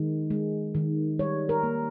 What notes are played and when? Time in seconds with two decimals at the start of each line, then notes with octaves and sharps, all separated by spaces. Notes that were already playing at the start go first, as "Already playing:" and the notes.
Already playing: D#3 G#3
0.30 G#3
0.75 D#3
1.19 G3 C#5
1.49 A#4
1.63 A#3